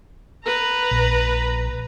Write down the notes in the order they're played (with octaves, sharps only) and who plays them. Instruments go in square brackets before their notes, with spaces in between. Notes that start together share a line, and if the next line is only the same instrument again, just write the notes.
[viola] B4 A#5
[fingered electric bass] A#1